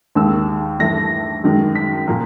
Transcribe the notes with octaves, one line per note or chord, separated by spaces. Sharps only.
D#2 D#3 G#3 E6
G2 E3 A3 A#6
F#2 D#3 G#3
B6
A#2 F3 A#3